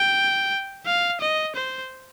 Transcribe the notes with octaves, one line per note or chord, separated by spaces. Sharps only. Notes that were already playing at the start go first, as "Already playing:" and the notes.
Already playing: G5
F5
D#5
C5